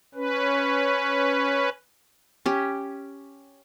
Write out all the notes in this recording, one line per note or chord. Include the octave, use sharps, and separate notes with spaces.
C#4 B4
C#4 G4